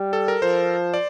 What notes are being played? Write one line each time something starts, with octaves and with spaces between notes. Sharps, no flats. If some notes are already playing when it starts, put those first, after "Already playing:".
Already playing: G3
A4
A#4
F3 C5
D5